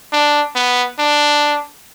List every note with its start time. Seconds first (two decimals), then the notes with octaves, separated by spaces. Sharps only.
0.12 D4
0.55 B3
0.99 D4